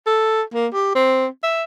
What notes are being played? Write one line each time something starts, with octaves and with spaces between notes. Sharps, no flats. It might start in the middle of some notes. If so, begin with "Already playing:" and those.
A4
A#3
G4
C4
E5